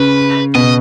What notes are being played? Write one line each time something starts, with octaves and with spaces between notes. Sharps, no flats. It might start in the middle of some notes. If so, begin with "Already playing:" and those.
Already playing: C#3 B4
B2 D#5